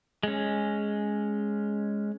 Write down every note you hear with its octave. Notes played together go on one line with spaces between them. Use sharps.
G#3 C#4